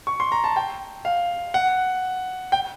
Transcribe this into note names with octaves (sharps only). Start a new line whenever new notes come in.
C#6
C6
A#5
A5
G5
F5
F#5
G5